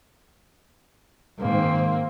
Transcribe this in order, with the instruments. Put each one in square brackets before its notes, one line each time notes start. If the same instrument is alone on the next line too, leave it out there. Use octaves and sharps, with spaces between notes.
[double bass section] G#2 D#3 [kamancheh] A#3 C4